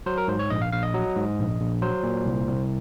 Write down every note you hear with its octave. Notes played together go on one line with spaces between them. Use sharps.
F#3 C5
A#4
G#2 C5
C#5
A#1 D#5
F5
A#1 F5
D#5
F#3
G#2
A#1
A#1
F#3 C5
A#2
C2
C2